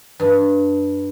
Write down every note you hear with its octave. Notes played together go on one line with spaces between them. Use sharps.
G2